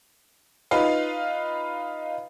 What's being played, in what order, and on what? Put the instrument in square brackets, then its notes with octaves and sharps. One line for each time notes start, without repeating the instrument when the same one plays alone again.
[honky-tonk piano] D#4 F4 B4 F5